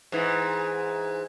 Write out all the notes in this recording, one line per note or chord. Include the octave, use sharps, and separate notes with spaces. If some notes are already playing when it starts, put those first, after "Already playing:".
G#2 E3